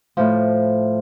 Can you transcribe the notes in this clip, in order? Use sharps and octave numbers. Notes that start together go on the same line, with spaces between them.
A2 F3